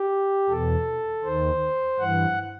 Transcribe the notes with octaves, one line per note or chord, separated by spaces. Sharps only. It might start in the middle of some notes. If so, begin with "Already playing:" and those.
Already playing: G4
E2 B2 A4
D#2 D#3 C5
G2 E3 F#5